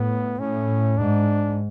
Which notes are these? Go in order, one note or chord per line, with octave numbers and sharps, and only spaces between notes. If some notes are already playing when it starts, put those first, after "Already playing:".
Already playing: A2 B3
A2 C#4
G#2 D4